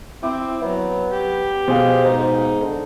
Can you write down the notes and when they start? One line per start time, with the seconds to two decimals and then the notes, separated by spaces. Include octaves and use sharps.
0.23 C4 E4 D6
0.62 F#3 B3
1.11 G4
1.68 B2 G#4 C5 F5
2.05 G#2 D#4
2.62 D3